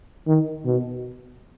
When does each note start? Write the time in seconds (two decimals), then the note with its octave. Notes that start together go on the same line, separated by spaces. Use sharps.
0.27 D#3
0.65 B2